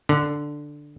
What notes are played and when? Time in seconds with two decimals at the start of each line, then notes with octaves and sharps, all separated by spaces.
0.09 D3